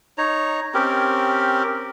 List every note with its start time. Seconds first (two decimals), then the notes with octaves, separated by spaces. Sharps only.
0.18 D#4 C#5 A#5
0.74 C4 C#4 G4 A#4